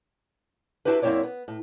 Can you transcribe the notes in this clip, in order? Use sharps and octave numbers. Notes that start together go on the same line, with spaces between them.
D4 E4 F#4 G4 B4
F#2 A#3 C4 E4 C#5 D5
B3
A2